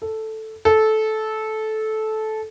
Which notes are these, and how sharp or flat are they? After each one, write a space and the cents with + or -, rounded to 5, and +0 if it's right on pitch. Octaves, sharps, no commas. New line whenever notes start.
A4 +0
A4 -15